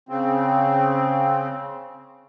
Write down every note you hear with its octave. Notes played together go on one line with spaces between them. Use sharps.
C#3 C4